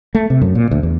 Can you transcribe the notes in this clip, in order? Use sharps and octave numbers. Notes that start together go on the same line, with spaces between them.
A3
C3
F#2
A#2
D2
E2